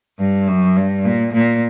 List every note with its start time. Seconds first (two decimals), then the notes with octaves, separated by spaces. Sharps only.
0.20 G2
0.48 F#2
0.77 G2
1.05 A#2
1.33 A#2